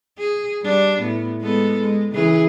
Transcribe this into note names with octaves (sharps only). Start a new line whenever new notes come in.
G#4
G3 D4
A2 B3
G#3 B3 A4
G#3
C#3 E3 G#4